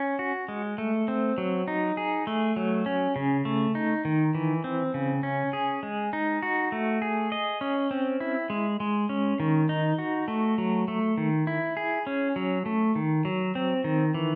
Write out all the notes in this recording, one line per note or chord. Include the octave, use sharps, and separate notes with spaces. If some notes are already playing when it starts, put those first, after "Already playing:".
Already playing: C#4
F#4
G#3
A3
C4
F#3
D#4
G#4
A3
F#3
C#4
C#3
A3
D#4
D#3
E3
C4
C#3
C#4
G#4
G#3
D#4
F#4
A3
G#4
D#5
C#4
C4
E4
G#3
G#3
C#4
D#3
D#4
F#4
A3
F#3
A3
D#3
E4
G#4
C#4
F#3
A3
D#3
F#3
C4
D#3
E3